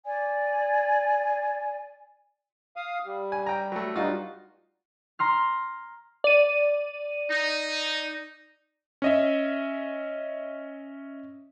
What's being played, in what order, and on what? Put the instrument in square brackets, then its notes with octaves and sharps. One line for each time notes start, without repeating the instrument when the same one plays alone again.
[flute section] D5 G#5
[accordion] F5 D#6
G3
[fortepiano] G#5
G5 A#5
F#3 A3
[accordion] G2 G3 D#4 [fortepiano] F4 F#4
[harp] A#5 C6 F6
[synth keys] D5 D#7
[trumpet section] D#4
[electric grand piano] C#4 D#5 E5